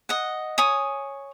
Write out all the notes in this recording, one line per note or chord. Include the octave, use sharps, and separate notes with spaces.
D#5 F#5
C#5 G#5 D#6